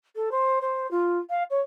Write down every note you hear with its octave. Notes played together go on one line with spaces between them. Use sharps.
A4
C5
C5
F4
F5
C#5